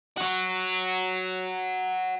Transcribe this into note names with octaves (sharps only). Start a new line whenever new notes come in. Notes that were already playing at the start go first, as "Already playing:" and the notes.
F#4 C#5